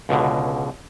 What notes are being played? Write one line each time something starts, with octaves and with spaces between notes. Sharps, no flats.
C#2 B2 D3